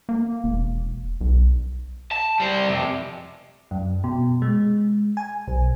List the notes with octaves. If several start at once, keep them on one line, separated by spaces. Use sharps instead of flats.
A#3
E1
B1
A5
G3 C5
F2 C3
F#2
B2
G#3
G#5
B1